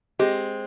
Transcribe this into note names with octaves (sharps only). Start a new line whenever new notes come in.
G#3 C4 G4